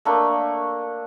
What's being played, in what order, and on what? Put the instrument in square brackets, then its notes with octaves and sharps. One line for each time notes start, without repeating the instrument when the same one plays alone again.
[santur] A3 A#3 D4